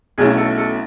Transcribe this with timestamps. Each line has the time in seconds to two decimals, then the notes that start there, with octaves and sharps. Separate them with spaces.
0.18 B1 B2 A3 C#4 E4 G#4
0.37 A4
0.58 A4